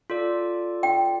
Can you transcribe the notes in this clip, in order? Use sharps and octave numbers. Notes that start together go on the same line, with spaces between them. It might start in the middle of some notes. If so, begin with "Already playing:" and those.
F4 A4 D5
G5